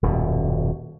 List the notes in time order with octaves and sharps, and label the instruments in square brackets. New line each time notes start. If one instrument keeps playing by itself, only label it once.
[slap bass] D#1 F#2 B2